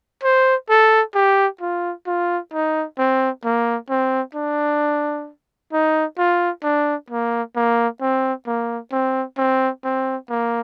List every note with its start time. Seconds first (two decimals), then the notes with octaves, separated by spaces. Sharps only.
0.24 C5
0.70 A4
1.15 G4
1.61 F4
2.07 F4
2.53 D#4
2.98 C4
3.44 A#3
3.90 C4
4.35 D4
5.73 D#4
6.18 F4
6.63 D4
7.10 A#3
7.56 A#3
8.01 C4
8.47 A#3
8.92 C4
9.38 C4
9.84 C4
10.30 A#3